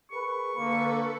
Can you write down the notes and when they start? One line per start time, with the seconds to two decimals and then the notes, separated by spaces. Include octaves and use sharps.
0.11 G#4 A#4 B4 C#6
0.57 D3 A#3 A4 B4